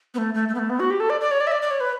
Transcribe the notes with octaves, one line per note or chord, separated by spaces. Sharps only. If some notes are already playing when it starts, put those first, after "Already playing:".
B3
A3
A3
A3
B3
A3
B3
F#4
G4
A4
D5
D5
C#5
D5
E5
D5
D5
C#5
B4